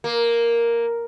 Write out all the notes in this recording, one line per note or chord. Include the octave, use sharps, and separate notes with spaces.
A#3